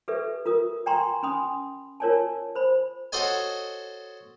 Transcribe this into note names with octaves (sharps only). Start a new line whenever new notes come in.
G4 A4 B4 D5 E5
F4 A#4 D#6
D5 G5 G#5 A#5 C6 C#6
C#4 G#5 B5 C6 D#6
F4 A#4 C#5 D5 G#5 A5
C5 B5
F#4 A4 C5 C#5 D#5 G#5